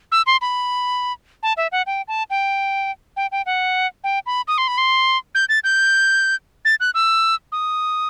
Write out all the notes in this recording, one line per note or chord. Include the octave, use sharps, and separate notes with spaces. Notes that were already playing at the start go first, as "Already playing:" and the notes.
E6
C6
B5
A5
E5
F#5
G5
A5
G5
G5
G5
F#5
G5
B5
D#6
C6
B5
C6
G6
A6
G6
A6
F#6
E6
D#6